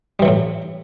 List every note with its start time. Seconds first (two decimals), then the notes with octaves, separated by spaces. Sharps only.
0.19 G3
0.22 E3
0.25 F#3
0.28 A2